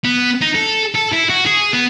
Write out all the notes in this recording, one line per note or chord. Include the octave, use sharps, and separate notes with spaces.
B3
D#4
A4
A4
E4
F#4
G#4
B3